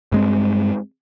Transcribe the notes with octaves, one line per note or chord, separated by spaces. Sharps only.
G2 G#3 C4